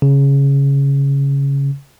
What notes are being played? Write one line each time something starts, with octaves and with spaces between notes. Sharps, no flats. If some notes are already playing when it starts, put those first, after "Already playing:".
C#3